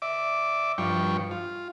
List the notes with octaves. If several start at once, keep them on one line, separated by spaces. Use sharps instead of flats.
D5 E5 D6
G2 F3 G5 C#6
F4